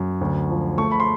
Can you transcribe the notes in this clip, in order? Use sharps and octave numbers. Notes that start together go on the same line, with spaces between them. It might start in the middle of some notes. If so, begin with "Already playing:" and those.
Already playing: F#2
D2
F3
A3 C#6
B5
C6